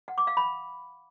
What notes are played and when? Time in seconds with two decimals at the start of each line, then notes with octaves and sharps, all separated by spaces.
0.08 F#5
0.18 D6
0.27 F5
0.37 B5